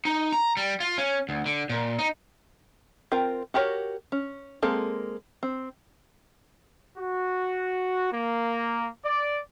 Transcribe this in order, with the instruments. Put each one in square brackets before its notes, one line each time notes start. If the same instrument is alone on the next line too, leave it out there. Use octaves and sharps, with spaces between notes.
[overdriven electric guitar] D#4
A#5
G3
F4
C#4
D2
D3
A#2
D#4
[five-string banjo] C4 F4 A#4 G5
F#4 G4 A#4 B4 C#5
C#4
G#3 A#3 C4 A4
C4
[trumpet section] F#4
A#3
D5